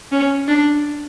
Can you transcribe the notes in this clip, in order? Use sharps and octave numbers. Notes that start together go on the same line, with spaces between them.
C#4
D4